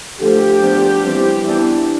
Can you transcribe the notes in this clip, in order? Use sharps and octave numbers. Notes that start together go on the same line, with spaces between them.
D3 F3 A3 G4
F3 B3 D4
E3 G3 C4
E3 B3 D4